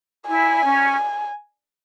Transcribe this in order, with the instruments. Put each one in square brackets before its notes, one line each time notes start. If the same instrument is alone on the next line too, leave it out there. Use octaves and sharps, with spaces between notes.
[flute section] E4 [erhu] G#5
[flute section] C#4